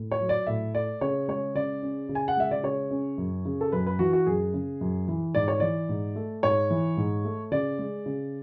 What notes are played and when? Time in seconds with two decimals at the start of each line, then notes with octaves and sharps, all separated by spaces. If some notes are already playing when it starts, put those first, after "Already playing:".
Already playing: A2
0.11 C#5
0.21 F#3
0.29 D5
0.47 A2 E5
0.75 A3 D5
1.01 C#3 C#5
1.28 G#3 C#5
1.55 C#3 D5
1.83 C#4
2.09 C#3
2.15 G#5
2.28 F#5
2.37 G#3 E5
2.51 D5
2.63 C#3 C#5
2.91 C#4
3.18 F#2
3.45 C#3
3.61 A4
3.72 F#2 B4
3.86 B4
3.99 E3 F#4
4.13 F#4
4.26 F#2 G#4
4.54 C#3
4.81 F#2
5.08 E3
5.35 G#2 D5
5.48 C#5
5.60 E3 D5
5.89 G#2
6.16 A3
6.43 G#2 C#5
6.70 E3
6.97 G#2
7.25 A3
7.52 C#3 D5
7.79 G#3
8.06 C#3